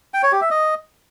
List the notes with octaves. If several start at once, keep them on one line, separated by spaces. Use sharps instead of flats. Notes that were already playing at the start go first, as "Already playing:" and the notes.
G5
C#5
G4
E5
D#5